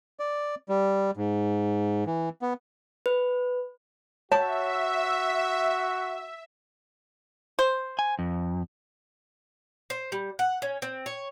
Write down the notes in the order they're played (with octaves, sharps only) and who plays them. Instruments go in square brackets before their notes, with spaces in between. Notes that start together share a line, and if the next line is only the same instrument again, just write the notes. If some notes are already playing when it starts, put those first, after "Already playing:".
[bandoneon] D5
G3
G#2
E3
B3
[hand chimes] B4
[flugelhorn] F#4 [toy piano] C#5 [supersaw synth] E5 [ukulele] A5
[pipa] C5
[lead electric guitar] G#5
F2
[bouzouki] C5
G3
F#5
C#4
C4
C#5